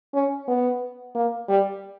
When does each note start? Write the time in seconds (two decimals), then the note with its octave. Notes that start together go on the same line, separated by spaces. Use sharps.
0.13 C#4
0.48 B3
1.15 A#3
1.49 G3